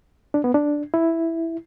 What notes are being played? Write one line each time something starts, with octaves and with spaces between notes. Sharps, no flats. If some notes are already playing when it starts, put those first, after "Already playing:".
D4
B3
D4
E4